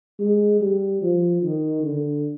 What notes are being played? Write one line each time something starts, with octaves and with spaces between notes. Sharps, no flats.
G#3
G3
F3
D#3
D3